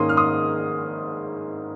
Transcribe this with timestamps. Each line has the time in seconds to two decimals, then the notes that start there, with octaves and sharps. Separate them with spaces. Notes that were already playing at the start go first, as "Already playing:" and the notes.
Already playing: G#2 D#3 A#3 C#4 C6 D#6
0.09 F6
0.17 C6 D#6